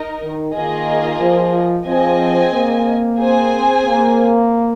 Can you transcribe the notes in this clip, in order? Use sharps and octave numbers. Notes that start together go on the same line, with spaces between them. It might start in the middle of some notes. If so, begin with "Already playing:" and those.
Already playing: D#4 A#4 D#5
D#3
D#3 A#3 F4 G#4 D#5
F3
F3 C4 G#4 D#5 G#5
A#3
C4 G#4 C5 G#5
A#3